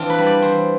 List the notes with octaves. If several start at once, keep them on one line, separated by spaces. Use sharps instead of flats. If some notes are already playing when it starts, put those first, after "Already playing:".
Already playing: E3 C4 D4 F4
B4
G3
D5
E3 C5